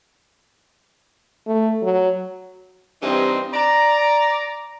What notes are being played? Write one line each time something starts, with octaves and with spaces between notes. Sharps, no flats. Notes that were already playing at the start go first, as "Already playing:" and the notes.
A3
F#3
G2 C3 E3 C4 D#4
D5 A#5